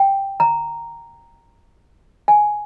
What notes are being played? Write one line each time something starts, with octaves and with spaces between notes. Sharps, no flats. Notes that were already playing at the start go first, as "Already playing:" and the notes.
Already playing: G5
A#5
G#5